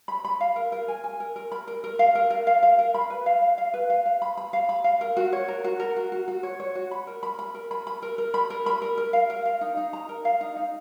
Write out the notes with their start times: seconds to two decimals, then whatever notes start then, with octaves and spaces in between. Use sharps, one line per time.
0.08 B5
0.25 B5
0.41 F5
0.56 A#4
0.72 A#4
0.88 G#5
1.04 G#5
1.20 A#4
1.36 A#4
1.52 B5
1.68 A#4
1.84 A#4
1.99 F5
2.15 A#4
2.30 A#4
2.47 F5
2.63 F5
2.79 A#4
2.94 B5
3.10 B4
3.26 F5
3.42 F5
3.58 F5
3.74 B4
3.90 F5
4.06 F5
4.22 B5
4.37 B5
4.53 F5
4.69 B5
4.84 F5
5.01 A#4
5.17 F#4
5.33 C#5
5.48 A#4
5.64 F#4
5.80 A#4
5.96 F#4
6.12 F#4
6.28 F#4
6.43 C#5
6.60 C#5
6.75 F#4
6.91 B5
7.07 A#4
7.23 B5
7.39 B5
7.55 A#4
7.71 B5
7.87 B5
8.02 A#4
8.18 A#4
8.34 B5
8.50 A#4
8.66 B5
8.82 A#4
8.98 A#4
9.13 F5
9.30 A#4
9.45 F5
9.61 D#4
9.77 D#4
9.93 A#5
10.09 A#4
10.25 F5
10.41 D#4
10.56 D#4